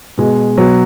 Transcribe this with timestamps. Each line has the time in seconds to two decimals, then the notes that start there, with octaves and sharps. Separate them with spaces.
0.18 B2 G#3
0.57 B2 F#3